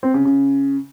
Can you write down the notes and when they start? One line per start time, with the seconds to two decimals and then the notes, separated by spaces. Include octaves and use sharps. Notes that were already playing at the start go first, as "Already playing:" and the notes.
0.03 C4
0.14 C#3
0.25 C#3